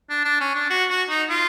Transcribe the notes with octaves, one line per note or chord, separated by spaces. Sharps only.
D4
D4
C#4
D4
F#4
F#4
D#4
F4